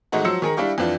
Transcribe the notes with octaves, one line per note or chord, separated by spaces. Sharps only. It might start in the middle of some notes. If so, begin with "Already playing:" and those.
G#1 G#3 A3 D#4 F#4
F3 F#3 C5 E6 A#6 C#7
D#3 G#4 A#4
G3 D4 E4 G4 F5 C#6
F2 E3 D4 F4